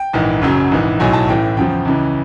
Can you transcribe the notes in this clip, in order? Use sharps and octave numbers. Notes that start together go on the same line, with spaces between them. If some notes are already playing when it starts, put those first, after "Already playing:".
Already playing: G5
A#1 G#2 E3
F#1 F#2 C#3 F#3
A#1 G#2 E3
B1 A2 F#3 G#5
A5
A1 A2 E3 G5
E2 C#3 F3 G5
C#2 C#3 E3